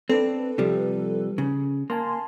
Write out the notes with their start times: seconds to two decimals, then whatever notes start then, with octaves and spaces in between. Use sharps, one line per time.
0.10 C4 D4 A4 B4
0.58 C3 F3 G3
1.38 C#3
1.90 A#3 G#5 A5 C6